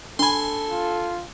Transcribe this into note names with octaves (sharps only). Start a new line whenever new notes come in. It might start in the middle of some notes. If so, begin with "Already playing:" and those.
D4 A4 G#5 B5 C6
F4